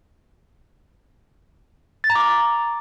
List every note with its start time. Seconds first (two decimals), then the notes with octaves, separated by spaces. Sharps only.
2.04 A6
2.10 A#5
2.15 D6